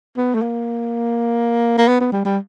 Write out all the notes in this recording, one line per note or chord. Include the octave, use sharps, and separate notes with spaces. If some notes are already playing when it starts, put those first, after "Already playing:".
B3
A3
A#3
A#3
B3
B3
G3
G3